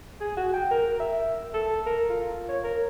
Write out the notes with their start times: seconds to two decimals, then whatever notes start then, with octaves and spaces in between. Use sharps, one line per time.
0.21 G#4
0.37 F#4
0.53 G5
0.71 A#4
1.00 E5
1.54 A4
1.86 A#4
2.09 F4
2.48 C#5
2.64 A#4